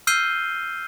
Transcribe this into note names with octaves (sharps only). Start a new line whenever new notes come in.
E6 F6 G6 C7 D#7 G7